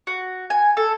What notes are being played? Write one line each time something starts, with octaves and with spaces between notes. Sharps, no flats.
F#4
G#5
A4